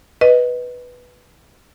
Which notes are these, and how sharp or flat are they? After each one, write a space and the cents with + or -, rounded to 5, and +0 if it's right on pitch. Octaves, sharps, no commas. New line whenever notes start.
B4 +0 D#5 +0